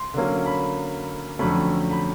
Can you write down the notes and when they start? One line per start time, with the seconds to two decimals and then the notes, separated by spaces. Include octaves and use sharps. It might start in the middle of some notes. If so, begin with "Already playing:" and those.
Already playing: C6
0.14 D3 F#3 A#3 C#4
0.46 B5
1.39 F2 D3 F#3 A3 C#4 B5
1.91 B5